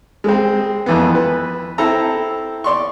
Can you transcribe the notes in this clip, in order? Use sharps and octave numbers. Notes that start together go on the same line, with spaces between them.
G#3 C4
F2 E3 B3
B4
C4 E4 A4 A#5
D5 C6 C#6